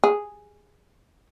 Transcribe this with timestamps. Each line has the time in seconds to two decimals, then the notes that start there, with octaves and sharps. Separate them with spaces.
0.04 G#4